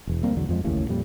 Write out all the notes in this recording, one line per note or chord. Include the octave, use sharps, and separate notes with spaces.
E1 E2
D2 G3 A#3 C4
B1 E2 D3 F#3
F2 F3 G#3
A1 D#2 A2 C#3
F2 A#2 G3